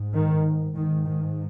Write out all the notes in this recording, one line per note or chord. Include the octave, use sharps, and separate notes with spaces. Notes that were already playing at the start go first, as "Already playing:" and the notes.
Already playing: G#2
D#3
G#2 D#3
D#3